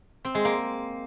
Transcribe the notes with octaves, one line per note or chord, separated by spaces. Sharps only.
C4
G#3
A#3